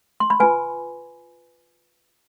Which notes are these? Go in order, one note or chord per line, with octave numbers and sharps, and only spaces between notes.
C6
B5
F4 B4 G#5